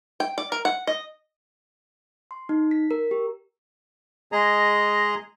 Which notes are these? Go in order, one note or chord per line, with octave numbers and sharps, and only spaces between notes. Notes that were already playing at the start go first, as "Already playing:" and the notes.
G5
D5
A#4
F#5
D#5
C6
D#4
B6
A#4
G4
G#3 G#4 D#5 A#5